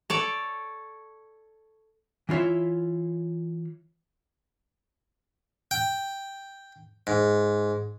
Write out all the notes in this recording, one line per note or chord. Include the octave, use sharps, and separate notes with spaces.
A4 C#5 D5
E3 E4 F4 C#5 E5
G5
G#2